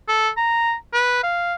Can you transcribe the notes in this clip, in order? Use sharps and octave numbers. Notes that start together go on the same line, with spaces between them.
A4
A#5
B4
F5